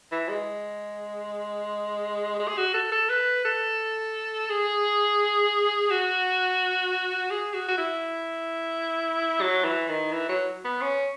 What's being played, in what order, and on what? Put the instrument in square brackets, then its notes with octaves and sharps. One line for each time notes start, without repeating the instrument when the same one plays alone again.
[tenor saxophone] E3
G#3
G#3
G#4
F#4
A4
A4
B4
A4
G#4
F#4
G#4
F#4
F#4
E4
F#3
E3
D#3
E3
F#3
B3
C#4